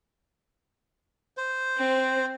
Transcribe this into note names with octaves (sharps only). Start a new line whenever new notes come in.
C5
C4